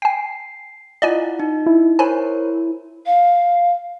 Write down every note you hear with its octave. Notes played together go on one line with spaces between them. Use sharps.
G5 G#5 C7
E4 F4 D5 D#5 F#5 G#5
D#4
E4
A#4 C5 C#5 G#5 A5 B5
F5